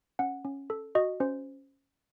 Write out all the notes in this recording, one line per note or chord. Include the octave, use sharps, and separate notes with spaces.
C#4 F#5
C#4
A4
F#4 D#5
C#4 C5